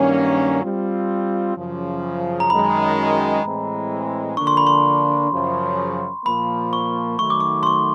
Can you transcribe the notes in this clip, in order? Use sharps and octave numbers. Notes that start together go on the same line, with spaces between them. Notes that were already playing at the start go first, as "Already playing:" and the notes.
Already playing: G2 D#3 F#3 A#3 C#4
G3 C4 F4
F#2 C#3 F3
A#5
F#2 D#3 G#3 B5
A2 E3 G#3 C4
D3 F3 A#3 D4 C#6
C6
B5
C6
F#2 C#3 F3
A#2 F3 A#3 B5
C#6
D#3 F#3 A3 C#6
D6
C#6
C6
C#6